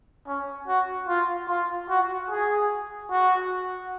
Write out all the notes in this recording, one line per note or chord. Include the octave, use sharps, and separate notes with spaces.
C#4
F#4
F4
F4
F#4
G#4
F#4